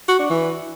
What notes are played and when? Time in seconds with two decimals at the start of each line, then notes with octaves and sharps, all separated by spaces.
0.08 F#4
0.19 D4
0.30 E3